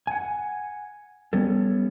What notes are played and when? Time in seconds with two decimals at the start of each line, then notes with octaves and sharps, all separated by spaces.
0.07 F#5 G#5
1.33 G3 B3 C#4 A4